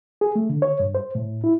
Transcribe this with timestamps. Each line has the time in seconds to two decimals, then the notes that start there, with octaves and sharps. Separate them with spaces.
0.21 G#4
0.35 A3
0.49 D3
0.62 C#5
0.80 G2
0.95 C5
1.15 A2
1.44 E4